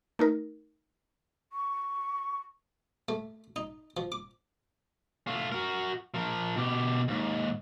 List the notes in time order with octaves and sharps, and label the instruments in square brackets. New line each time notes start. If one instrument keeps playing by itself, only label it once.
[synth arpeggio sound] A3 D#4 A#4
[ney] C#6
[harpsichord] A3
D#4
F3
D6
[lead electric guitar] A3 F4
F#4 A#4
F3 A#4
B2 G4
D#2 G#2